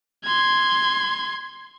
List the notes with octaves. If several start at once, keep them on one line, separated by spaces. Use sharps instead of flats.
C6 G#6